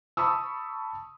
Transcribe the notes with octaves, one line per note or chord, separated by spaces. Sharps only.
A5 B5 C#6 D#6 E6